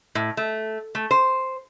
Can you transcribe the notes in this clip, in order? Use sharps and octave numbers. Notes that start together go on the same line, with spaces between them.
A2
A3
A3
C5